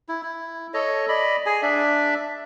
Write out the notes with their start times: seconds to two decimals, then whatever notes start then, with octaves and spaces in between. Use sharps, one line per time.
0.09 E4
0.23 E4
0.74 A4 C#5 D#5
1.09 D5 D#5 B5
1.46 G#4 G#5
1.62 D4 D5 E5